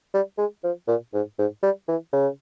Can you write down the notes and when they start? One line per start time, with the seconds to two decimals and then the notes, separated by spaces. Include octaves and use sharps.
0.14 G3
0.38 G#3
0.64 F3
0.88 A#2
1.13 G#2
1.39 G#2
1.63 G3
1.88 E3
2.13 C#3